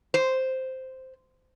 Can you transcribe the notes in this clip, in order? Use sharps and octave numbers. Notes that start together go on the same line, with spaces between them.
C5